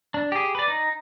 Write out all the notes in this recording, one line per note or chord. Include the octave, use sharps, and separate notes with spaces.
D4
G4 G#4
B4 D5
D#4